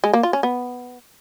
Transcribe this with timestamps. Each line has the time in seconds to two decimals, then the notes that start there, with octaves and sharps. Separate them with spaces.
0.04 G#3
0.14 A#3
0.23 F4
0.33 C#4
0.43 B3